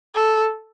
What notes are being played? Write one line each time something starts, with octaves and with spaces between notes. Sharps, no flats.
A4